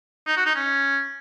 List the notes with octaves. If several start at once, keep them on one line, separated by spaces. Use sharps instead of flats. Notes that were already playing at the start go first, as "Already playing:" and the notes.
D#4
F#4
D#4
C#4